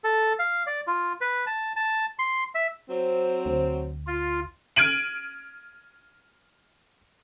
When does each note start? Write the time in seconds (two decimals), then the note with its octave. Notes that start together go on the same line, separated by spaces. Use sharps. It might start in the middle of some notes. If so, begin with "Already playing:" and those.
0.04 A4
0.39 F5
0.67 D5
0.87 F4
1.21 B4
1.47 A5
1.76 A5
2.19 C6
2.55 E5
2.89 F#3 C4
3.46 D2
4.07 F4
4.76 F6 G#6 D7 D#7 F#7